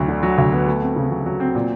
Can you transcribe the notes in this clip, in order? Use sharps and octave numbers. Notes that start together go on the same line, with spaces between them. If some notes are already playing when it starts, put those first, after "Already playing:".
Already playing: D2 F#3
D3
F#3
D2
B3
A3
C4
C#3
F#3
F#3
C4
A#2